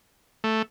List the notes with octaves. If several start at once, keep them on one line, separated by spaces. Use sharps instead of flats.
A3